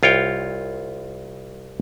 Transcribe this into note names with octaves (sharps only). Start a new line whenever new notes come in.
C2 F4 C#5 G5